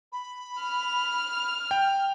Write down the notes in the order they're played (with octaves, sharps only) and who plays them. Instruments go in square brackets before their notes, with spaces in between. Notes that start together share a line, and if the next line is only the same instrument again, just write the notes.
[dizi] B5
[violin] F6
[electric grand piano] G5